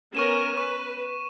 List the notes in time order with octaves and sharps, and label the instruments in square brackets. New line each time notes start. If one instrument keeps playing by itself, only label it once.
[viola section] B3 C#4 A#4 [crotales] C#6 D#7 E7
[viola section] B4 [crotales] C#6